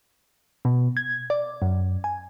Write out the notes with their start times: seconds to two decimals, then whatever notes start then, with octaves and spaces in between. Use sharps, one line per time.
0.65 B2
0.97 G#6
1.30 D5
1.62 F#2
2.04 G#5